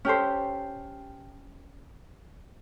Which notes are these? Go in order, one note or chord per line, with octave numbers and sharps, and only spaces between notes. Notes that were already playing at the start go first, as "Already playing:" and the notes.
C#4 G4 A4 C5